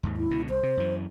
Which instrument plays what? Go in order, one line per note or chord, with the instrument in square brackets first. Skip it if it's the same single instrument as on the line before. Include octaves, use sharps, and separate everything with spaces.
[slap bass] D#2 G#2
[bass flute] E4
[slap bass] C#2 B2 D3
[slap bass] C2 [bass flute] C5
[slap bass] C3
F#2 E3